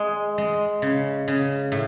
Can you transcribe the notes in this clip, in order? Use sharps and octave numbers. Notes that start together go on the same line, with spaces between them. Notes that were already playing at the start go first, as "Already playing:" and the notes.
Already playing: G#3
G#3
C#3
C#3
A2